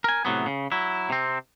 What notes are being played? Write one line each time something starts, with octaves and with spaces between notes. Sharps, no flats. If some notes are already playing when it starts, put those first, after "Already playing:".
A#4 G#5
A2 C3 F#3 B3
C#3
F#3 E4
C3 C4